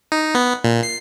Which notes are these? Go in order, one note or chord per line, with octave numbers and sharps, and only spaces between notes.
D#4
B3
A#2
C7